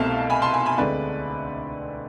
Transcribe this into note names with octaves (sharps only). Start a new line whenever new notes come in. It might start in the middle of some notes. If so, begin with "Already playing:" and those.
Already playing: C2 B2 A3 C4 F5 A5
G#5 B5
A5 C6
G#5 B5
G#5 B5
D2 D3 G#3 C4 B4 D5